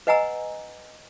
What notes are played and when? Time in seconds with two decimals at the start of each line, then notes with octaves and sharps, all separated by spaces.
0.07 B4 D#5 F#5 G#5 A#5 E6